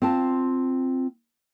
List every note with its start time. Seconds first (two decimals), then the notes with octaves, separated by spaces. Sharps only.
0.02 C4 F4 A5